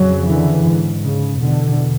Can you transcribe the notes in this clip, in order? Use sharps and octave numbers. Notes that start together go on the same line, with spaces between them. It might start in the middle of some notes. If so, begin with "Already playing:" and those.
Already playing: F2 C#3 F#3
D3 E3
G#2
C#3
E2 B2 D3